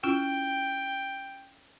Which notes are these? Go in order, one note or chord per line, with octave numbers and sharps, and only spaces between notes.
C#4 E4 F4 G5